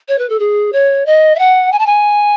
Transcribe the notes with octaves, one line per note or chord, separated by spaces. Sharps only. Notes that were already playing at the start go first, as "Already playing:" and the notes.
C#5
B4
A4
G#4
C#5
D#5
E5
F#5
G#5
A5
G#5